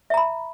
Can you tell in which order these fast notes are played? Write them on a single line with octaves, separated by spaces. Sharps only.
E5 A#5 B5